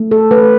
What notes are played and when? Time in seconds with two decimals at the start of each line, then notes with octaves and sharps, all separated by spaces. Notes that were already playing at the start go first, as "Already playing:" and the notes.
Already playing: A3
0.11 A4
0.31 A3 B4